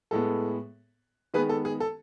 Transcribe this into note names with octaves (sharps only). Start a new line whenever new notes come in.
A2 G#3 B3 A4
D#3 G#3 B3 G#4 B4
A4
G#4
A4